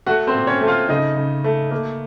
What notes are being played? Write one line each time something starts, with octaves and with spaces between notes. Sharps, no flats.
A3 F#4 F#5
C4 C5
A#2
C#4 C#5
A3
F4 F5
C#3 D#4 D#5
C#3
A3
A#3